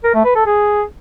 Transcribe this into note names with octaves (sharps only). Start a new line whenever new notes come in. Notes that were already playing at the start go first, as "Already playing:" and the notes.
A#4
A3
B4
A4
G#4